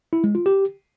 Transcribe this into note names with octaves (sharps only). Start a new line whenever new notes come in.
E4
G#3
F4
G4